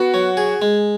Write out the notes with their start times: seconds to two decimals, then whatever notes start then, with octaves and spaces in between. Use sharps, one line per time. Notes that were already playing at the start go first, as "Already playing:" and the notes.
Already playing: B3 F#4 F#5
0.14 F#3
0.37 G#4
0.62 G#3